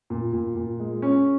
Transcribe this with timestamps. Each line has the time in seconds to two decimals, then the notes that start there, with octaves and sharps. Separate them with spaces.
0.10 A#2
0.33 A#2
0.56 A#2
0.80 G#3
1.02 C#4